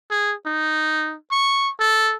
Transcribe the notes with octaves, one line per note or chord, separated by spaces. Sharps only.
G#4
D#4
C#6
A4